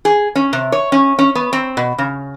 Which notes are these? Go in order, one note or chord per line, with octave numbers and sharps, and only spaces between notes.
G#4
C#4
C3
C#5
C#4
C#4
B3
C4
B2
C#3